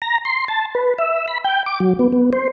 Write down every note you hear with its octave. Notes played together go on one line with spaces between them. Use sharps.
A#5
C6
A5
B4
E5
B5
G5
D6
F#3
B3
B3
C5